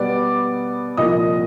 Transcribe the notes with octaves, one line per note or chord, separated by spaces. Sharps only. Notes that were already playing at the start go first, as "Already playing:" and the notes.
Already playing: B2 G3 B3 D5 D6
C2 A#2 F3 D#5 D#6